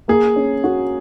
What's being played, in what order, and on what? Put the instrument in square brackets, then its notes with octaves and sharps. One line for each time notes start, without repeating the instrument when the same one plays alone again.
[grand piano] A#3 [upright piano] G#4
[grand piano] C#4
F#4